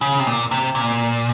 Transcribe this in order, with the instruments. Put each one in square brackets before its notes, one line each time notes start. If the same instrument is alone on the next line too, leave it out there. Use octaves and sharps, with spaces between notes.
[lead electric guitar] C#3
C3
A#2
C3
A#2